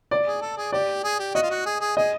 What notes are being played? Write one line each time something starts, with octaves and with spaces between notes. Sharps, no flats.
D5
G#4
A4
G#4
G4 D5
G#4
G4
F#4 D#5
F4
F#4
G#4
G#4
G#4 D#5